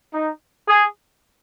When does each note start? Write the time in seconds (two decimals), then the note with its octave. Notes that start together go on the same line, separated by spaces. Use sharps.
0.14 D#4
0.68 G#4